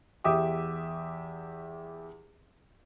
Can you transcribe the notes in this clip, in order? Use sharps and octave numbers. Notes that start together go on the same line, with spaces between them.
E2 G4 E5 D6 D#6